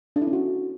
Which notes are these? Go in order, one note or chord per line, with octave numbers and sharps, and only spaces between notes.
D4
E4
C#4
F#4